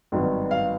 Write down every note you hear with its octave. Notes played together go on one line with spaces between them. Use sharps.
G#1 G2 D#3 F#3 B3
F5